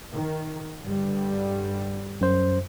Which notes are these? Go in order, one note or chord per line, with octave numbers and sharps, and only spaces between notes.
D#3
G2 D3 G3
F#2 C5